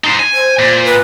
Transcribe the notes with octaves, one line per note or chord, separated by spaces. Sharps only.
D#4 C5
G#5
C5
A#2
B4